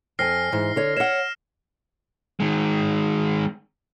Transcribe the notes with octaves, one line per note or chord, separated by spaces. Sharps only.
F2 G#5 F6 A#6 C7
G#2 E3
D3 C#5
C#5 F#5 F6 E7
D#3 G#3